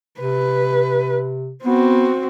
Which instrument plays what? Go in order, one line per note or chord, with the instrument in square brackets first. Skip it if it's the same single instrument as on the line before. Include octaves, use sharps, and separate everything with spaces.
[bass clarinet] C3 [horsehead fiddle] B4
[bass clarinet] B3 [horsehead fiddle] C4 F#4